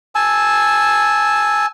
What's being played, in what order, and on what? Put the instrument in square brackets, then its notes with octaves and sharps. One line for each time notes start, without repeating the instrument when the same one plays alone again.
[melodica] G#5 A5 E6